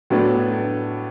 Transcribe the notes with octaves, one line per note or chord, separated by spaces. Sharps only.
A2 F#3 B3 D4